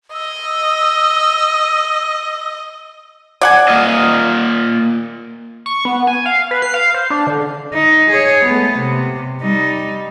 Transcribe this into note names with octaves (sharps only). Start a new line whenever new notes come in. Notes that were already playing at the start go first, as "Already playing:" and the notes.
D#5 E6
D5 F#5 G#5
A#3 F4 D#5
C#6
B3
G#5
F5
B4
C7
F5
C5
D4
D3
D#4
G#4 C#5
A3 B3
C3
G3 D#4